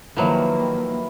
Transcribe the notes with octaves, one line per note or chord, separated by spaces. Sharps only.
D#3 F3 F#3 A#3 E4 B4